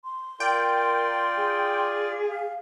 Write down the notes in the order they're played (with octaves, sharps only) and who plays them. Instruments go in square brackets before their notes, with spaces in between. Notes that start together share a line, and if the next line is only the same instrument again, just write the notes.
[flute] C6
[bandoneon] F4 D5 [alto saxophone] A#4 [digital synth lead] G5
[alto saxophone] G#4
[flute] F5